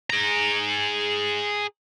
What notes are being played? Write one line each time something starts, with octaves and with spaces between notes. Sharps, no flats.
G#4 A#5